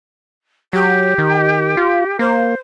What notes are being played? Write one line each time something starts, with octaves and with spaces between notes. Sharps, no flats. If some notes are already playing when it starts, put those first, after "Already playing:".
F#3 G4
D#3
F4
A#3 C5